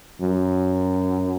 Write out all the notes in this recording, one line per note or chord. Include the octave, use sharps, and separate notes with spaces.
F#2